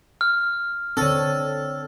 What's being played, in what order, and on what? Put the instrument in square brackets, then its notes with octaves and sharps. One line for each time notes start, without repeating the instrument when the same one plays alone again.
[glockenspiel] F6
[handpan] D3 D4 [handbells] C4 C#5 [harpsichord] A4